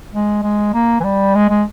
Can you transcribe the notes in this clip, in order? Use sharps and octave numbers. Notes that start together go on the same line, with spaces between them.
G#3
G#3
A#3
E3
G3
G#3
G#3